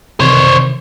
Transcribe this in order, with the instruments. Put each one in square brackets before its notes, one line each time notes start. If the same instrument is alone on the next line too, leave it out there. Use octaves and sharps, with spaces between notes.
[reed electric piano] C3 D#3 E3 [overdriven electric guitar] C5 C#5